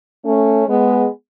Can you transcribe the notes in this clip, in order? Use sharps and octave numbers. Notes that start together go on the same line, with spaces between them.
A3 C#4
G#3 B3